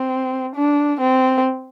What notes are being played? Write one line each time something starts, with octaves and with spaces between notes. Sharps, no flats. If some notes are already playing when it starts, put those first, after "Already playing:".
Already playing: C4
D4
C4